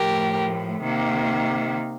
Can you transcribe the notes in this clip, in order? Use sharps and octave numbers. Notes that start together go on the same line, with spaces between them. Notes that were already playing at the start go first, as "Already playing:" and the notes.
Already playing: A2 F3 A3 G4 A#4
C3 D#3 A#3